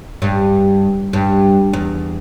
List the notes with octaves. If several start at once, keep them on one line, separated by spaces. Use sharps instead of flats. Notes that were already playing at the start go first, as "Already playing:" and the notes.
G2
G2
E2